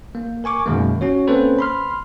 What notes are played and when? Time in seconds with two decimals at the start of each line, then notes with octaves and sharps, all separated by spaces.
0.15 A#3
0.44 A#4 G#5 C#6 D6
0.66 F#2 B2 D#3 G#3 A#3
1.01 C#4 F#4 C#5
1.28 A#3 C4 C#4 A4 B4 C5
1.59 B5 C6 F6